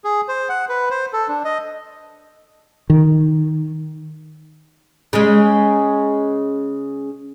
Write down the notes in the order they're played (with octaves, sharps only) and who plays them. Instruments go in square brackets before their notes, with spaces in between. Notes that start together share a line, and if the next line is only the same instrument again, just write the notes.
[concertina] G#4
C5
F#5
B4
C5
A4
D4
D#5
[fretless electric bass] D#3
[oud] C#3 G#3